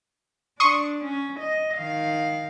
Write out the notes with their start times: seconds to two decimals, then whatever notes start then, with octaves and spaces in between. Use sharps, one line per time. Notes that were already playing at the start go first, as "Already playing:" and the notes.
0.60 D4 C6 C#6 D#6
1.04 C#4
1.39 D#5
1.77 D#3 F5